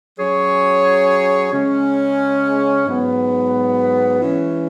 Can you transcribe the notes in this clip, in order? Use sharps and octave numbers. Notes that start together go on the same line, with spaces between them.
F#3 C#4 G#4 C#5
C#3 G#3 C#4
G#2 F#3 B3
E3 G#3 C#4